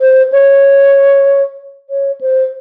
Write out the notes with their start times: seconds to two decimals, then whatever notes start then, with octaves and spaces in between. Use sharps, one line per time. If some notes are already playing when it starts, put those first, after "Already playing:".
0.01 C5
0.32 C#5
1.90 C#5
2.21 C5